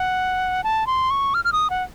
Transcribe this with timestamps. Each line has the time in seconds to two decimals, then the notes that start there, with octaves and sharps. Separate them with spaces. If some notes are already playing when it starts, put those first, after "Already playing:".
Already playing: F#5
0.64 A5
0.87 C6
1.11 C#6
1.34 F6
1.45 F6
1.53 D#6
1.70 F#5